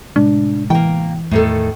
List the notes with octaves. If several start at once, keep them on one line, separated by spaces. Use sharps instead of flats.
A2 C3 G#3 D4
E3 A#3 G5
E2 A2 D#3 A3 A4